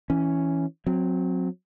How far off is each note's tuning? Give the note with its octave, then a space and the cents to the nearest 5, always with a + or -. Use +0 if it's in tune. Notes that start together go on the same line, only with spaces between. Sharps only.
E3 -5 C#4 +0
F#3 -20 C4 +0